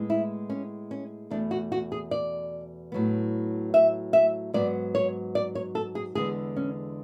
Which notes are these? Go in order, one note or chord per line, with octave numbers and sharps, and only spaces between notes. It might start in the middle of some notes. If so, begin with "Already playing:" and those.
Already playing: A2 G#3 B3
E4
C#4
C#4
E2 B2 A3 D4
F#4
F#4
G#4
D5
A2 F#3 B3
E5
E5
G#2 F#3 B3 D5
C#5
D5
C#5
A4
G#4
E2 D3 G#3 B3 G#4
C#4